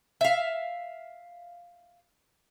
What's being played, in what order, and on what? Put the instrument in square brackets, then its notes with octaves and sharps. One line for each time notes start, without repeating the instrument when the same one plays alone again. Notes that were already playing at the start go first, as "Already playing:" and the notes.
[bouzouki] E5 F5